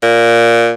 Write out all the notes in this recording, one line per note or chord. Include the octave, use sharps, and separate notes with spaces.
A#2